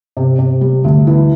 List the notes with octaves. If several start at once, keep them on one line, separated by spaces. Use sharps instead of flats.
C3
C3
G3
D2
E3